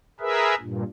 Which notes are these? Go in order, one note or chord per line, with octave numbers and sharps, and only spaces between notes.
G#4 A#4 B4 E5
G2 A#2